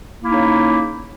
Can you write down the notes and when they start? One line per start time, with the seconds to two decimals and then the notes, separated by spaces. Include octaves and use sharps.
0.21 A#3
0.24 E4
0.28 D#4
0.32 C#3